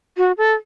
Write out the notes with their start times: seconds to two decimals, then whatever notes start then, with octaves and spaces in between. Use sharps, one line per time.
0.17 F#4
0.38 A4